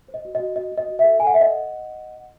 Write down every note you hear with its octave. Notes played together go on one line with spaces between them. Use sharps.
C5
D#5
F#4
D#5
F#4
F#4 D#5
F#4
D#5
F#4
A4 E5
A4 G#5
F#5
A4 E5
D#5 F#5